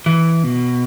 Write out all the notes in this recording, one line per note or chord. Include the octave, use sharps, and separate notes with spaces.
E3
B2